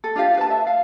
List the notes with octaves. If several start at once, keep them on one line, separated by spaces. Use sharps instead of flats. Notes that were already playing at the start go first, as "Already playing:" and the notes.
A4
D4 F4 G4 F5
B4 A5
E5
F5